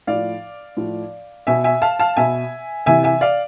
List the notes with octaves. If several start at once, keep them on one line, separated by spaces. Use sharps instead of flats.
A2 F3 D5 F5
A2 F3
B2 E5 G#5
E5 G#5
F5 A5
F5 A5
B2 E5 G#5
C3 E3 E5 G#5
E5 G#5
D5 F5